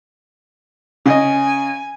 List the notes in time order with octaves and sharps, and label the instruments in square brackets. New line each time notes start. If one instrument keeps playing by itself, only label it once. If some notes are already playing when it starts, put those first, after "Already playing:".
[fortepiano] C#3 D#5 [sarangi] G#5